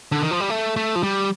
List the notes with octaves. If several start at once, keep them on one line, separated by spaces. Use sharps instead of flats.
D3
D#3
F3
G3
A3
A3
F3
G3